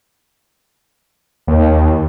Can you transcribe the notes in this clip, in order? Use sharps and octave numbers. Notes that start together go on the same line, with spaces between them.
D#2